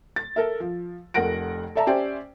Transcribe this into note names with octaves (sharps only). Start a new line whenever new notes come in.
A6
A4 A#4 E5
F3
F1 F2 A#4 F#5 A#6 D7
A4 D5 E5 A5 A#5
C#4 G4 C5 D5 E5 G5